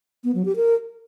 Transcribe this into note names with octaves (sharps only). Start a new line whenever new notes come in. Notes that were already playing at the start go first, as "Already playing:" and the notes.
B3
F#3
G4
A#4